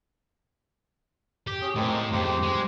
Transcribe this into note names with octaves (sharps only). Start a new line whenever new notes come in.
G4
C#4 G#4
A2 G#3 A#3 C4
F2 G4 C5
G#3